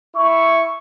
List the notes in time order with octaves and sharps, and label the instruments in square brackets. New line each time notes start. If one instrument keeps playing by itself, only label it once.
[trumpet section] E4 C#6